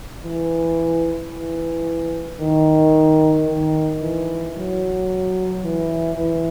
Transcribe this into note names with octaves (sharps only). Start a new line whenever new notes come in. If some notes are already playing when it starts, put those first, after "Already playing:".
E3
E3
D#3
D#3
E3
F#3
E3
E3